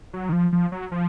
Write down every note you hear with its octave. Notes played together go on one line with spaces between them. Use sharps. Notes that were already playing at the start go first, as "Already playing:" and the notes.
F#3
D#3
F3
F3
F#3
F3